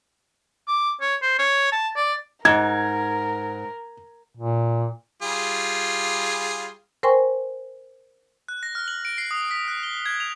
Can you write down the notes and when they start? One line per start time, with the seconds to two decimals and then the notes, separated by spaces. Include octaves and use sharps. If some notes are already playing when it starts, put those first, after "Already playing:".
0.68 D6
1.01 C#5
1.22 C5
1.39 C#5
1.72 A5
1.96 D5
2.45 G#2 A#4 G#6
4.37 A#2
5.23 G3 F4 G#4
7.03 A#4 C5 G5 G#5 C6 C#6
8.48 F#6
8.63 A#6
8.75 F6
8.88 F#7
9.05 D7
9.18 C7
9.31 D#6
9.51 B6
9.68 F#6
9.83 G7
10.06 G#6
10.20 F7